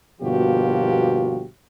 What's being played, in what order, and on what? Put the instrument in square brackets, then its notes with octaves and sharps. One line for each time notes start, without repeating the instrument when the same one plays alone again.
[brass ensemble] G1 B2 F3 A#3 F#4 G4